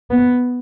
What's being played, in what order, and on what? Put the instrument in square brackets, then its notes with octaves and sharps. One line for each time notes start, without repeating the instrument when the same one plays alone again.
[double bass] B3